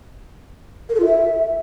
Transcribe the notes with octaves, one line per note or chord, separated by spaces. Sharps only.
A#4
A4
F4
E5